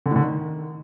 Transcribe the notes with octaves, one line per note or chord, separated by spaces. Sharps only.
D3
A2
D3
D#3